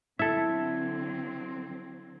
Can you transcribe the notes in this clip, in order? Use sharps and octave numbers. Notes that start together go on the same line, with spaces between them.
D3 F#3 C4 E4 A4 E5 G#6